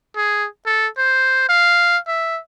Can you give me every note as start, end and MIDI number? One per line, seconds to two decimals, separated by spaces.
0.16 0.47 68
0.66 0.87 69
0.98 1.48 72
1.49 1.98 77
2.07 2.39 76